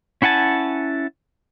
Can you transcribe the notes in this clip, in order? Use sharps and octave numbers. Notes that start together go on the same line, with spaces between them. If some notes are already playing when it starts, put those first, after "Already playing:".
C#4 E4 F#5 G#5 A5